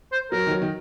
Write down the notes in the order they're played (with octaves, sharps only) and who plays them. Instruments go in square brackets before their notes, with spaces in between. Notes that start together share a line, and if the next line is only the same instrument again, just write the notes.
[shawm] C5
[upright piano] F#3 [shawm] A#4
[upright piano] D#3
F#3
D#3